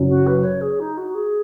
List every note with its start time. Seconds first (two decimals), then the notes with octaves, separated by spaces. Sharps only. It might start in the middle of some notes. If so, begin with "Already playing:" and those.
Already playing: F#1 F#2 F#3 C#4
0.08 F#4
0.26 B4
0.43 C#5
0.61 G#4
0.79 D#4
0.97 F#4
1.14 G#4